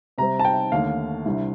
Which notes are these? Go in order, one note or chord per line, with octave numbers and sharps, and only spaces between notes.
C3 G3 C4 A#5
A5
G5
D#2 D3 A3 F5
C2 C3 G3 D4